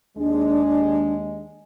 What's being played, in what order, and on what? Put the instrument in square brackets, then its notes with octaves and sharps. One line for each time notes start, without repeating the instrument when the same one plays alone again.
[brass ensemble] D#2 G#3 [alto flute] D4